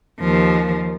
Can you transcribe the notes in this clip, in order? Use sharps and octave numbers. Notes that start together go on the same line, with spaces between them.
D#2 F3